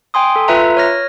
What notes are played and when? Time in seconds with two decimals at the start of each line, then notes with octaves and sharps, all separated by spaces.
0.14 G5 G#5 C6 D#6
0.36 A4
0.48 F4 B4 E5 A#5
0.77 C#5 F6 A#6